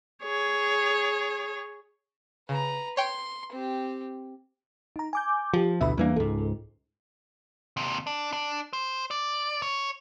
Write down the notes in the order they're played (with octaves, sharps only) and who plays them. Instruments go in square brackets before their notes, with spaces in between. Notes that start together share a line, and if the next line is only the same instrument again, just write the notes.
[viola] G#4 C#5
[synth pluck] C#3 [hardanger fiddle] B4 A#5
[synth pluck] C#5 G5 [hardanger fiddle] C6
[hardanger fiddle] C4 G4
[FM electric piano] D#4 A#5
G#5 D6 G6
[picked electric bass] F3 [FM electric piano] F4 G4
[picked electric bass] A1 D2 B2 [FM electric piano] E5 B5
[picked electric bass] E2 E3 A#3 [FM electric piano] G3 D4
[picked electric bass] C#2 G#2 [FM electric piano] A4
[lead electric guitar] D#2 C3
D4
D4
C5
D5
C#5